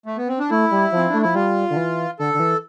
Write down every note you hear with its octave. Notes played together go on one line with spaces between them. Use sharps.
A3
B3
C4
D4
A3 E4
G3
F3 C4
A3 D4
F3 E4
G3 F4
D3
E3
D3 A4
D3
E3